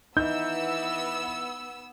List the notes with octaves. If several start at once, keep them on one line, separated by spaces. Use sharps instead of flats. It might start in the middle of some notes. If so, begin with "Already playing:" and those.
E3 B3 D#4 E6 G6